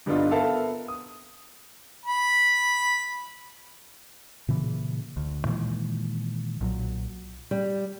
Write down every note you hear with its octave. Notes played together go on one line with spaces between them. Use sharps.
G2 D3 B3 D4 D#4 F4
B3 A4 A#4 E5 F5 A5
D#6
B5
A#2 C#3 E3
D2
A#2 D#3 E3 G#3
B1 A#2 F3 F#3
G3